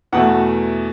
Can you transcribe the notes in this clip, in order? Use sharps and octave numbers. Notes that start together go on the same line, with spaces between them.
E2 B2 A3 F#5